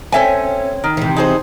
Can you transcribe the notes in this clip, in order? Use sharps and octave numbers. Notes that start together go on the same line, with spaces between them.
C4 C#4 A4 E5 G#5
D#3
C3 E3
D#4 G#4 C5